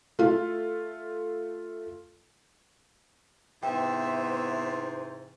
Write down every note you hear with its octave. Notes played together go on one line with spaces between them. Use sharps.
A3 F4
G#2 C3 E3 B3 C5 E5 G5